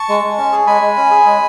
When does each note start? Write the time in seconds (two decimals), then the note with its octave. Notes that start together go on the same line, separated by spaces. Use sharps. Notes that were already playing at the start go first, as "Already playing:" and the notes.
Already playing: A5 C#6
0.09 G#3
0.24 G#3
0.38 C#4
0.52 G#4
0.67 G#3 G#5 B5
0.81 G#3
0.96 C#4
1.11 G#4
1.26 G#3